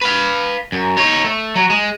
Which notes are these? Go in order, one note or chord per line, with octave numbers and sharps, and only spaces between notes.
B4 F5
F#2
D#4 C#5
A3
F#3
G#3